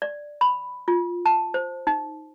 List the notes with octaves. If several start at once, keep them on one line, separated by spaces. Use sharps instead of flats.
D5
B5
F4
A5
C5
D#4